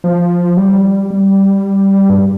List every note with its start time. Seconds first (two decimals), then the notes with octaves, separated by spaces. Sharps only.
0.04 F3
0.57 G3
1.11 G3
2.10 G2